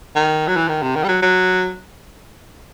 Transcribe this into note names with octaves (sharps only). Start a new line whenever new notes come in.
D#3
F#3
E3
D#3
C3
D#3
G3
F#3
F#3